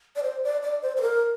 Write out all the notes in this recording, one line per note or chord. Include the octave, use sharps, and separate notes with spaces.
D5
C5
D5
D5
C5
C5
A#4